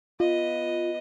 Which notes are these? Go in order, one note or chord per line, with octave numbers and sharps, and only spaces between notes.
B3 F4 D#5